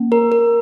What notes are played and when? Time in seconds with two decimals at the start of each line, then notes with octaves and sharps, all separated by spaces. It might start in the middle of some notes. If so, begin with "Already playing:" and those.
Already playing: A#3 C#4
0.12 A#4
0.32 A#4